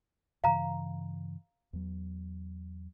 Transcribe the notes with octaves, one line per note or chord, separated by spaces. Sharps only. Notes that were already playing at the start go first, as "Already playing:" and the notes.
G2 C#3 E3 F5 A#5
E2 F#3